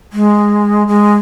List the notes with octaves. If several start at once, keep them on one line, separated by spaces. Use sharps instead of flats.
G#3
G#3